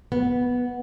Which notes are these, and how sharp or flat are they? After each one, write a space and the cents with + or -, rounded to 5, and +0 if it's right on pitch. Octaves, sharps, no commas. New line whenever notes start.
B3 -5